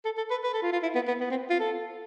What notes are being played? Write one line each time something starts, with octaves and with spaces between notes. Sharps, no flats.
A4
A4
B4
B4
A4
F4
F4
E4
B3
B3
B3
C4
F4
A4